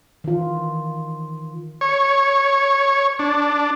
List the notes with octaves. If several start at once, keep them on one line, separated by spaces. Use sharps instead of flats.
D#3 E3 F4
C#5
D4